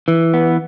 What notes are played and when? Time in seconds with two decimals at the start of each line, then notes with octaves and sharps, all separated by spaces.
0.08 E3
0.34 B3